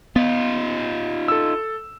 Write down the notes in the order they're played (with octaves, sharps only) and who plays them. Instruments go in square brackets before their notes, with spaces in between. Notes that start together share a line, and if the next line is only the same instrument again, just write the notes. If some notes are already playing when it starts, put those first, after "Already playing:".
[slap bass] B3 [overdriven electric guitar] D#4 F4
[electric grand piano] A4 E6